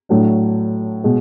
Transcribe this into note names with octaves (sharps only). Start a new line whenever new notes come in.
A2 F#3 A3 D4
B2 G#3